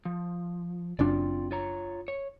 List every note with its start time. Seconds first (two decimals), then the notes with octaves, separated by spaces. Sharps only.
0.05 F3
0.99 F#1 F#2 C4 D4 F4 D5
1.51 F4 C#5 A#5
2.08 C#5